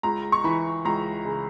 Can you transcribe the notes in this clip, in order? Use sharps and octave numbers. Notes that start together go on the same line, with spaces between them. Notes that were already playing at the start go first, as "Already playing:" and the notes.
C#2 A#5
C#6
E3 B5
C#2 A#5
C#3